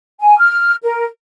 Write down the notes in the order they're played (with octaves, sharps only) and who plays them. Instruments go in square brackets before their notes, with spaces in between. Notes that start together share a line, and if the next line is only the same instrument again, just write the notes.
[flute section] G#5
F6
A#4